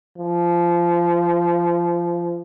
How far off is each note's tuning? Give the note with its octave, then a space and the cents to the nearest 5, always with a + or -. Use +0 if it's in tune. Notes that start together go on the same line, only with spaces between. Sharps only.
F3 -20